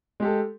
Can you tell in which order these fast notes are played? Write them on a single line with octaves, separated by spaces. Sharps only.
G#3 G4 A4